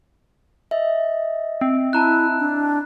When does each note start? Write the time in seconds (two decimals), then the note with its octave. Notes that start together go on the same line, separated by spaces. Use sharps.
0.71 D#5 E5
1.61 C4
1.93 E4 A5 A#5 F#6
2.40 D4